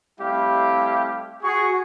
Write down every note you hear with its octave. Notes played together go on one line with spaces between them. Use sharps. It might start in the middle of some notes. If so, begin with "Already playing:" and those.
G3 A3 C4 E4 G4 F5
F#4 G#4 C#6